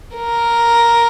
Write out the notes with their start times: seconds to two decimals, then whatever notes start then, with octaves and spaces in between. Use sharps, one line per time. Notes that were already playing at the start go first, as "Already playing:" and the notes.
0.16 A#4